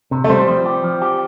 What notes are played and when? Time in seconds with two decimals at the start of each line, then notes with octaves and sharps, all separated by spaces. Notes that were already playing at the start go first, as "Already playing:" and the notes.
0.11 C3
0.24 A3
0.29 G3 C4 C5
0.47 F3
0.66 G4
0.84 F3
1.02 G4